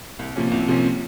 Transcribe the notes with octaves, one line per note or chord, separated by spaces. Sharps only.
C2
C3 F3 A#3 C#4
C2
C3 F3 A#3 C#4